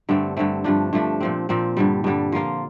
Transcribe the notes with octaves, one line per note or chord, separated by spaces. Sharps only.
G2 D3 A3 C4
G2 D3 A3 C4
G2 F3 A3 D4
G2 F3 A3 D4
A#2 F3 C4
A#2 F3 C4
G2 D3 G3
G2 D3 G3
F3 A#3 F4